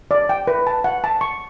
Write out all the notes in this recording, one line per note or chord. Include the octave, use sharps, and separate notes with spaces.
D5
G5
B4
A5
F#5
A5
C#6